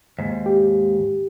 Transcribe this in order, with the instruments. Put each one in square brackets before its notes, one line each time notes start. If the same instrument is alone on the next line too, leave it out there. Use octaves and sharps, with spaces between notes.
[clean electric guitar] D#2 G#2
[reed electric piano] G4